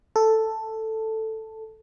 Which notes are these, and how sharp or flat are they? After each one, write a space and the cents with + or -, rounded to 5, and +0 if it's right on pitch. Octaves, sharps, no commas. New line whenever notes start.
A4 +5